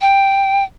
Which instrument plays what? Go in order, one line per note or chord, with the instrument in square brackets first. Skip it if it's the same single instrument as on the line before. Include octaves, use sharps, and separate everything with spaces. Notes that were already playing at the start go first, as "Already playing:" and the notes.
[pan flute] G5